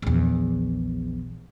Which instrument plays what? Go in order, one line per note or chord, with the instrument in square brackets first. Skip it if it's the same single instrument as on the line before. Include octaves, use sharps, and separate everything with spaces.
[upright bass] A#1 E2